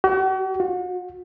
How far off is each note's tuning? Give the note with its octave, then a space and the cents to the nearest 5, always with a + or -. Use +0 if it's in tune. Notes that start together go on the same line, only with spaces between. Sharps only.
F#4 +45
F#4 -40